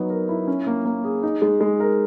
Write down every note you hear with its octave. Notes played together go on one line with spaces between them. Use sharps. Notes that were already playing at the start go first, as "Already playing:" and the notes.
Already playing: F#3 B3 D#4
A#4
E4
C#4
A#3
A#3
G#4
D#4
G#3
G#3
A#4